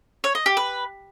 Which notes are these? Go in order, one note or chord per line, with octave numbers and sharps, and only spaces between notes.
C#5
D#5
G4
B4